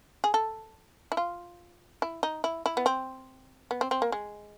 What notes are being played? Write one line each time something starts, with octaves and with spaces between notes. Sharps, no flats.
G#4
A4
E4
F4
E4
D#4
E4
E4
B3
C4
B3
C4
C4
A#3
G#3